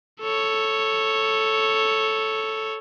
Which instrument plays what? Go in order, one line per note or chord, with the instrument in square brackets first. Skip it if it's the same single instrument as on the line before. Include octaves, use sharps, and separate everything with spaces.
[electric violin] A4 C#5